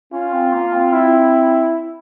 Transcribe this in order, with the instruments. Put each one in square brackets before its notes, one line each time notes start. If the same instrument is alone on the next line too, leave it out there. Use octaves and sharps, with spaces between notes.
[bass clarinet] C#4 [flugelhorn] F4
[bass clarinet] C4
A#3
C4
[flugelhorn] E4